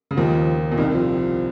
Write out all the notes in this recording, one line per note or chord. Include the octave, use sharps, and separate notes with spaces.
C#3
D#2 D#3 F3
A#2
C2 C3 D#3
F3